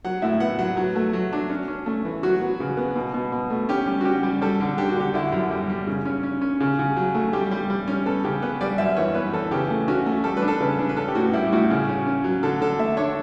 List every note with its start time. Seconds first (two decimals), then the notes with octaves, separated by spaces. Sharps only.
0.05 F#3 F#5
0.22 A2 E5
0.40 B3 F#5
0.59 F#3 F#5
0.77 F#3
0.96 A3
1.13 F#3
1.33 D4
1.50 C#4
1.68 C#4
1.86 A3
2.05 E3
2.23 F#3 F#4
2.41 B3
2.60 C#3
2.77 B3
2.96 B2
3.14 B2
3.32 B2
3.50 A3
3.69 C#4 G4
3.86 G3
4.01 F#4
4.05 C#4 G4
4.23 G3
4.41 G3 A4
4.60 D3
4.78 D4 G4
4.89 F#4
4.96 D3 G4
5.14 D3 E4
5.32 F#2
5.51 G3
5.69 G3
5.87 C#3
6.05 C#4
6.23 C#4
6.42 C#4
6.60 C#3
6.79 C#3
6.97 F#3
7.15 A3
7.33 G3 G4
7.51 G3
7.70 G3
7.88 C#4
8.06 B3 A4
8.24 C#3 G4
8.42 B3 B4
8.61 G3 D5
8.78 F#2 E5
8.97 E3 C#5
9.15 B3 B4
9.33 E3 A4
9.51 C#3 G4
9.70 A3
9.88 C#4 F#4
10.06 A3
10.24 G3 A4
10.37 B4
10.42 D4
10.48 A4
10.60 C#3 B4
10.79 D4
10.89 B4
10.97 C#4 A4
11.08 G4
11.15 A2 F#4
11.33 G3 E4
11.46 G4
11.52 A2 F#4
11.70 C#3
11.89 C#4
12.07 C#4
12.24 F#3
12.43 D3 A4
12.61 D3 A4
12.79 A3 E5
12.97 D4 C#5